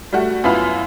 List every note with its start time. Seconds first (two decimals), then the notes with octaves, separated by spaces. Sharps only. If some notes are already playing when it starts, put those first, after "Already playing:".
0.13 G3 A3 F#4
0.44 F#2 B3 E4 F4 B5 F6